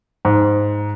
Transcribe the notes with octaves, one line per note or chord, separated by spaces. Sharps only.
G#2